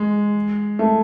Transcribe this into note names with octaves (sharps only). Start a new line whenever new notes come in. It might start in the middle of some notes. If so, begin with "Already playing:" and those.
Already playing: G#3
A3